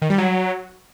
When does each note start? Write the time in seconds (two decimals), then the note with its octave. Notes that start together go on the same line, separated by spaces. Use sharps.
0.02 D#3
0.10 G3
0.18 F#3